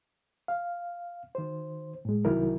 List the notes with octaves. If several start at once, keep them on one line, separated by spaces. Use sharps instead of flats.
F5
D#3 C5
A2 G#3
C2 D#3 F#3 E4 A#4